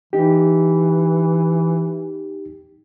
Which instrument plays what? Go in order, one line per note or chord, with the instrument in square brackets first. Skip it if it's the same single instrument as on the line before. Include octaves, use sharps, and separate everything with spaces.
[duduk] E3 [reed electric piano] D#4 G4